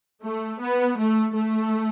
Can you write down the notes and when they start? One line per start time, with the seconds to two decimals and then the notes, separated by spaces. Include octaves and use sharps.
0.23 A3
0.60 B3
0.98 A3
1.35 A3